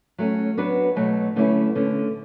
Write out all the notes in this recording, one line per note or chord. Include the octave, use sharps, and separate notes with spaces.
F#3 A3 C#4
F#3 B3 D4 F#4 B4
B2 F#3 A3
D3 A3 C#4 E4 B4
D3 A3 C#4